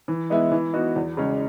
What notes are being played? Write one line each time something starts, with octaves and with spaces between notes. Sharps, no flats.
E3
G#3 B3 E4
E3
B3 D#4 F#4
E2
C#3 G#3 C#4